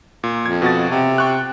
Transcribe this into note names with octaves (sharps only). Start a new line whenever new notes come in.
A#2
F2 G#6
B2 F#4 A6
C3
G5 C#6 F#6